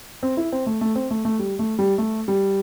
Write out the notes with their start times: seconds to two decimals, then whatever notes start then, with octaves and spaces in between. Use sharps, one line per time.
0.23 C4
0.37 E4
0.52 C4
0.66 A3
0.81 A3
0.95 C4
1.11 A3
1.25 A3
1.39 G3
1.59 A3
1.79 G3
1.98 A3
2.28 G3